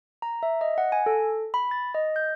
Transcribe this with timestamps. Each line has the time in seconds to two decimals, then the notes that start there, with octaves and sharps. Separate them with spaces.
0.22 A#5
0.43 E5
0.61 D#5
0.78 F#5
0.92 G#5
1.06 A4
1.54 B5
1.71 A6
1.95 D#5
2.16 G6